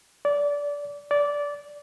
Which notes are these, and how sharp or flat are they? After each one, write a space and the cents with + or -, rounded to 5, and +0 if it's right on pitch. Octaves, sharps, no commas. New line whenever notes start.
D5 -20
D5 -15